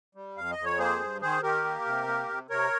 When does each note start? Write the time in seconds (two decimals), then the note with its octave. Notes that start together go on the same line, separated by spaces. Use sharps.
0.15 G3
0.36 F2 F5
0.51 D#5
0.58 F2
0.65 C#5
0.78 A#3 G#4 C5
1.00 G2
1.22 D#3 G#4 C5
1.43 D#3 G4 A#4
1.64 A#3
1.86 C3
2.07 A#3
2.28 C3
2.50 C3 A#4 C#5